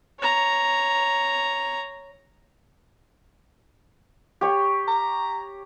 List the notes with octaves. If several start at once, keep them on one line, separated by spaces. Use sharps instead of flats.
C#5 A#5
G4 C#5
A#5